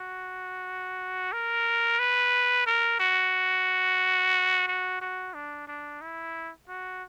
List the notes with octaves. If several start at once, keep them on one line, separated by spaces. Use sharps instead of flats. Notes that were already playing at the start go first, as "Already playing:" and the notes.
Already playing: F#4
A#4
B4
A#4
F#4
F#4
F#4
D4
D4
E4
F#4